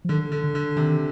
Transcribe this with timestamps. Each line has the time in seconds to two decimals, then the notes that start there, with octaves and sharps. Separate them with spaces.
0.05 F3
0.09 D3 D#3
0.32 D3
0.44 D3
0.55 D3
0.77 C3 D#3